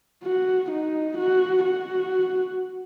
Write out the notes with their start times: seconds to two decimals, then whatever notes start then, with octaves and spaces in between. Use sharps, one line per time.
0.24 F#4
0.71 D#4
1.18 F#4
1.64 F#4